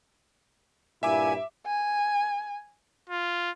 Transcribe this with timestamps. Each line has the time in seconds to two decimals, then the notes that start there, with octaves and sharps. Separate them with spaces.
1.03 G2 A#2 E4 E5 G#5 D6
1.66 G#5
3.10 F4